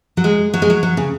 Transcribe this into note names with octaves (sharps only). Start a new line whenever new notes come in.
F#3
G#3
F#3
G#3
F#3
F#3
C#3